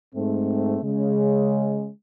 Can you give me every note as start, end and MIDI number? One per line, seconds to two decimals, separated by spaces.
0.14 0.78 44
0.14 0.78 57
0.14 0.78 60
0.83 1.88 49
0.83 1.88 56